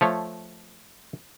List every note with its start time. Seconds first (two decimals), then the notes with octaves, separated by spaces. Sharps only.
0.01 F3 A3 C#5